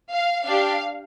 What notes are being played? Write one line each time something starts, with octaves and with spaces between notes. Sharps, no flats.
F5
D4 G4 F5